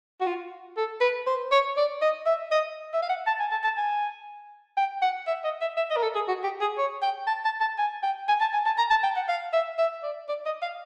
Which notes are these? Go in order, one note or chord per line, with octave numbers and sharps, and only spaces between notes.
F#4
F4
A4
B4
C5
C#5
D5
D#5
E5
D#5
E5
F5
F#5
A5
G#5
A5
A5
G#5
G5
F#5
E5
D#5
E5
E5
D#5
A#4
A4
G#4
F#4
G4
G#4
C#5
G5
A5
A5
A5
G#5
G5
G#5
A5
G#5
A5
A#5
A5
G5
F#5
F5
E5
E5
D5
D5
D#5
F5